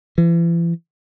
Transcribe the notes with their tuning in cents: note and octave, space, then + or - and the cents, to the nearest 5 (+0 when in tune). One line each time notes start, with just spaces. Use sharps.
E3 +40